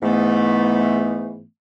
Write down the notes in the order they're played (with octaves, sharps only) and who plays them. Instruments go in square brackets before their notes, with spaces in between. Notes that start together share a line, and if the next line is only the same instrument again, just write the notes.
[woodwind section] G#2 E3 A3 B3